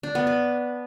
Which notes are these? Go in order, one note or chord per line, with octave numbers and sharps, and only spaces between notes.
D4
B3
B4